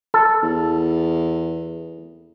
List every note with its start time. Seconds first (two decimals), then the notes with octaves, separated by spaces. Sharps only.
0.14 A4
0.43 E2